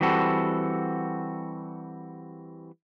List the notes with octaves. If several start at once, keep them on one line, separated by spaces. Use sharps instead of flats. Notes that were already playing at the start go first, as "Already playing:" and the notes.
E3 G3 C4 F#4 A4